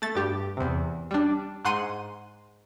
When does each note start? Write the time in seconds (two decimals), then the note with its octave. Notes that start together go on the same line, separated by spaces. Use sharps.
0.02 A3 A6
0.15 G2 G4
0.57 E2 C3
1.11 G3 D4
1.65 G#2 F#5 C6 D#7